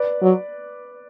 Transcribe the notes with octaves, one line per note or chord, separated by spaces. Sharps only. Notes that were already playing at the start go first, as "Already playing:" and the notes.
Already playing: B4 D5
F#3